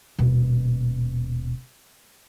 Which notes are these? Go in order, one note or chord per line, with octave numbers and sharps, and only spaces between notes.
D#1 B2